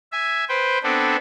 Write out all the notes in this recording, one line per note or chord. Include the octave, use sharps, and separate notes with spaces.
E5 G#5
B4 C5 G5
B3 C4 D4 A4